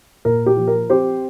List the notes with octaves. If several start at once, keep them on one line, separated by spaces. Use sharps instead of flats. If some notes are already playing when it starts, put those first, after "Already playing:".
A#2 A#4
G4
F3
A#4
C4 G4 C5